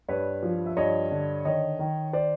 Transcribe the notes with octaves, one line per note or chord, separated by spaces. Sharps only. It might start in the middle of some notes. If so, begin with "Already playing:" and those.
G2 B4 C#5
F3
E5
G2 C#5 D#5
D3
D#3 C#5 D#5
D#3
C5 D5